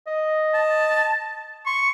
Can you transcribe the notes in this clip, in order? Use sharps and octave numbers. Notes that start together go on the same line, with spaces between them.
D#5
A5
C6 C#6